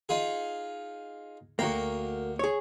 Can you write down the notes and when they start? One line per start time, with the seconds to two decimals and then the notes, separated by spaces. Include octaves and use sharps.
0.09 D#4 F4 G#4
1.59 D2 A#3 F#4 A#4 G5
2.39 G#4 C#5